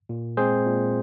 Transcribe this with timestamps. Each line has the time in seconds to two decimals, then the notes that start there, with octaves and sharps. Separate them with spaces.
0.09 A#2
0.37 G#3 C4 G#4 C5
0.66 A#2